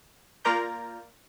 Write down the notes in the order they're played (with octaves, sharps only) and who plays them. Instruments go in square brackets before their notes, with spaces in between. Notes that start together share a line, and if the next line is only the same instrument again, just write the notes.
[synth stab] A#3 F4 A#4 D5 A#5 G6